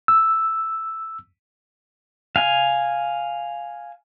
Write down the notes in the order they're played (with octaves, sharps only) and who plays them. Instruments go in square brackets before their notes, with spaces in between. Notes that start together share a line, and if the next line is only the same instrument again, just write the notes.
[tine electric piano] E6
[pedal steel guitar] F5 G#5